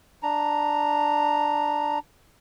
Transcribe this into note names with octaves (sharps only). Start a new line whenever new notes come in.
D4 A#5